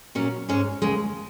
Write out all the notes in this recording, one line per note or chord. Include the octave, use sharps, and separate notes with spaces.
A#2 F#3 C#4
G#2 G#3 C#4
D#2 C#3 G#3